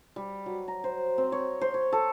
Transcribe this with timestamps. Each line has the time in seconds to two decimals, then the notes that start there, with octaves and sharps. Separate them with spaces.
0.16 G3
0.46 F#3
0.68 A#5
0.84 C5
1.18 C4
1.32 C#5
1.61 C5
1.74 C#5
1.93 A4